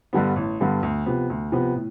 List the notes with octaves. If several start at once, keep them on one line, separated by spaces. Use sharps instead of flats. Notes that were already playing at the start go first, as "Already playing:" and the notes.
G2 D3 G3 B3
A1
G2 D3 G3 B3
D2
C3 F3 B3
D2
C3 F3 B3
A2